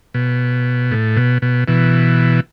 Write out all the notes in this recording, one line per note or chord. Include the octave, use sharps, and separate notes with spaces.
B2
A2
B2
B2
B2 E3